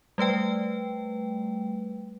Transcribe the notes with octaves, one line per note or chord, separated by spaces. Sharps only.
G3 A3 B4 G5